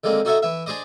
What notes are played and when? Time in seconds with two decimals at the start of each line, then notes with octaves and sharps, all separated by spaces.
0.04 D3 D#3 G#3 A#3 C4
0.25 D#4 F#4 A4 C#5 D#5 E5
0.42 E3 E5
0.66 D4 G#4 C5 D5 D#5